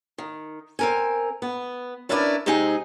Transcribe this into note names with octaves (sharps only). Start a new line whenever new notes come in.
D#3
C4 A#4 G#5
B3
C#4 D4 E4 A#4 B4 D5
C3 G#3 C4 D#4 G#4